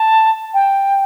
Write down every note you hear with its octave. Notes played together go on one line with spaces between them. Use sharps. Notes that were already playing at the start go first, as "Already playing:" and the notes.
Already playing: A5
G5